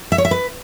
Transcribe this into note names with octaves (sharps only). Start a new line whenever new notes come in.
E5
C#5
E5
B4